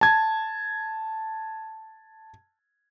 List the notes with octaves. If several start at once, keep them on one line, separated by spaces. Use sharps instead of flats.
A5 G#6